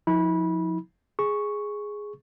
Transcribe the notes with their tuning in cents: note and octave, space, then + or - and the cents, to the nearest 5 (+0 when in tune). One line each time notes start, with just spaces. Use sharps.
F3 +25 E4 -45 B5 -20
G#4 +0 C#6 +0